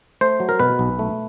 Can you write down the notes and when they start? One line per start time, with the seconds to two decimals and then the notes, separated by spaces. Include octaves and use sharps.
0.21 A3 C5
0.40 F#3
0.49 A#4
0.60 B2 B4
0.79 B1
0.99 A3